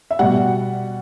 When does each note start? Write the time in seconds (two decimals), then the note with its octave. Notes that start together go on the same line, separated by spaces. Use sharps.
0.11 E5
0.19 B2 G3 F#5